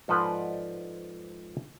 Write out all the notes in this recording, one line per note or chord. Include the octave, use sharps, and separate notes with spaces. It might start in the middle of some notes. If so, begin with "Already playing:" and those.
G#2 F3 A4 B4 D5